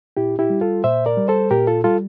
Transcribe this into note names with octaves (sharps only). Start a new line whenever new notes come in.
A#2 E4 G4
E4 G4
G3
F4 A4
A#2 C5 E5
A#4 D5
G3
A4 C5
A#2 G4 A#4
F4 A4
G3 F4 A4